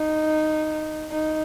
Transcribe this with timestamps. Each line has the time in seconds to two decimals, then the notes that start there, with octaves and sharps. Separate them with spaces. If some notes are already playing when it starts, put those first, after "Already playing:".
Already playing: D#4
1.11 D#4